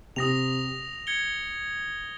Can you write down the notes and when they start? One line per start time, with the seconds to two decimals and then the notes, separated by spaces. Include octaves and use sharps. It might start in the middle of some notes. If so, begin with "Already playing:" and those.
0.16 C3 D#6 A#6 F7
1.07 G#6 C#7 G7